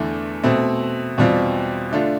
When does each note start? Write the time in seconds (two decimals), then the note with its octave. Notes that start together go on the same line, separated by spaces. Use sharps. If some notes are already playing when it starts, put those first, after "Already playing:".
Already playing: E2 D3 A3 E4
0.44 B2 A3 C4
1.18 E2 B2 G3 C4 F4
1.91 D3 A3 D4 F4